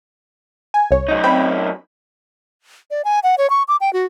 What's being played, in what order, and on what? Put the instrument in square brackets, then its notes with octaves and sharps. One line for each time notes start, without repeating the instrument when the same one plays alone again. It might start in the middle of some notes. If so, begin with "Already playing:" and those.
[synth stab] G#5
C2 C#5
[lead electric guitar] F#2 D#4
[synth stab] C4 G5 B5
[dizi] D5
G#5
F#5
C#5
C#6
D6
G5
F#4